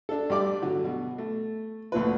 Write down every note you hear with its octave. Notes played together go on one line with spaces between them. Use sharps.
D4 A4
G2 G4 D5 D6
D3 F#3
B2
A3
D2 A#2 F3 B4